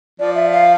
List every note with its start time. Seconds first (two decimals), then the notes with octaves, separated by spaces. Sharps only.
0.19 F3 D5
0.35 E5
0.53 F5